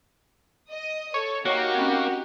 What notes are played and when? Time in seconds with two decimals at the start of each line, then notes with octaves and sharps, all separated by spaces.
0.70 D#5 D#6
1.14 A4 C#5
1.45 A#3 D#4 F#4 G4 C#5
1.75 C4 C#4